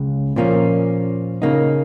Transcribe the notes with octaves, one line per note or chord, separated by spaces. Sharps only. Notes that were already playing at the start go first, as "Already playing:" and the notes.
Already playing: C#2 C#3 G#3
A#2 F3 A#3 C#4
C#3 A#3 D#4